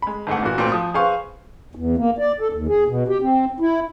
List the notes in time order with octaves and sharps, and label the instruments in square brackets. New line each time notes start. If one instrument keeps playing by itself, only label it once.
[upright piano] G#3 B5
G1 G#2 A3 F#5
A#2 E3 F#4
A#2 A3 C4
F3 D#6
G#4 B4 C5 F5 C#6
[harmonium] E2
A#3
D5
A4
D#2
G#4
B2
G4
C4
E4